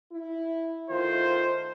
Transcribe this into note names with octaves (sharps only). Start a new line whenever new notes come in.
E4
D#3 A3 F4 C5